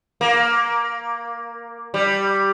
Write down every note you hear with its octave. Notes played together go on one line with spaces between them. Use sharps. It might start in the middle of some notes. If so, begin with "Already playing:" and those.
A#3
G3